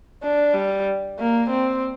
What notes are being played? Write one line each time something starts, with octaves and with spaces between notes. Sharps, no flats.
D4
G3
A#3
C4